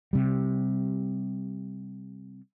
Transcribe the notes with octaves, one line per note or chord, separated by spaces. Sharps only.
C3 G3